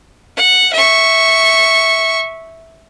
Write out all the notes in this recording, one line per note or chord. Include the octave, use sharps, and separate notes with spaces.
F#5
E5 C#6